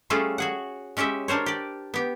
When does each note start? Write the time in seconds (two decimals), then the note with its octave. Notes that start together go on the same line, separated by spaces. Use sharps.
0.10 G3 A3 C#4 F4 G#4 A4
0.38 F#4 G#4 F#5
0.97 G#3 C#4 G4 D#5 E5
1.28 D4 A#4 C5 C#5
1.46 G4 D5
1.94 B3 G4